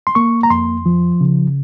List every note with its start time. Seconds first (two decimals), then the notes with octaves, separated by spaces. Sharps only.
0.07 C6
0.15 A#3 C#6
0.43 A#5
0.50 F2 C6
0.86 F3
1.21 C#3